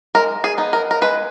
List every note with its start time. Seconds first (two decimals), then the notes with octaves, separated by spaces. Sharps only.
0.15 G#3 A#4
0.44 G#4
0.58 B3 D#4
0.73 A#4
0.91 A#4
1.02 G#3 B4